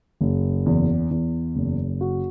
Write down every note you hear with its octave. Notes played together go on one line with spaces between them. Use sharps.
F#1
E2
E2
F#1
F#4